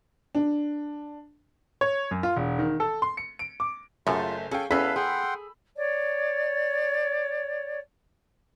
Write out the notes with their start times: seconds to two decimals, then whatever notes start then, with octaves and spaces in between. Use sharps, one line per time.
0.35 D4
1.81 C#5
2.11 F#2
2.23 F4
2.36 E1
2.59 D#3
2.80 A4
3.02 C6
3.17 C#7
3.39 D7
3.60 D6
4.07 F#1 F#2 A3 F4 G#4
4.51 C#4 G#4 A4 F5 G5
4.71 E2 C#4 A4 B4 F5 B5 E6 B6
4.96 G#4 F#5 G5 C6
5.77 C#5 D5